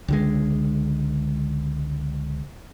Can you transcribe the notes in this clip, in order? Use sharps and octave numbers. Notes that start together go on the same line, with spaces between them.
C#2 D3 G#3